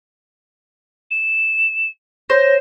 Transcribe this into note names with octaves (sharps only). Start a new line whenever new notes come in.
E7
C5 C#5 A#6